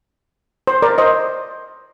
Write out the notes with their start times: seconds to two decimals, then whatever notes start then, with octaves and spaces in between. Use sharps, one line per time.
0.67 C5
0.82 A#4 D5
0.98 C5 D#5